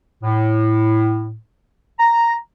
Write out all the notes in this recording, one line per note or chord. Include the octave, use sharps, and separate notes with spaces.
A2
A#5